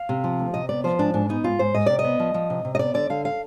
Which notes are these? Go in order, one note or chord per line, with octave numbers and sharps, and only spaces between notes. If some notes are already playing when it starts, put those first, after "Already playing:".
Already playing: F5
C3
F3
D2
C3 D#5
B3 D5
F3 C5
G#2 D4
G#2 D4
B3 D#4
G#2 F4
G#2 C5
G#2 D#5
C3 D5
D#5
B3
F3
F3
C3
C3
D#5
B3 D5
D3 D5
D3 F5
F5